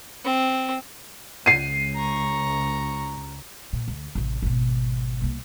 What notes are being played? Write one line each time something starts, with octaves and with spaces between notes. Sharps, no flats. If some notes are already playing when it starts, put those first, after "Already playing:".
C4
C#2 C7 D#7
A#5 C#6
A#2
D2
A1 C3
G#1 B2
C2 A#3